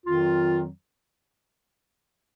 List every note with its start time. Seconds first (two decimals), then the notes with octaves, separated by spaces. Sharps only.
0.06 F2 D#3 F#3 F4